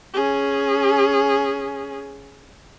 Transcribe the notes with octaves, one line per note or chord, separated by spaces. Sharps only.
C#4 G#4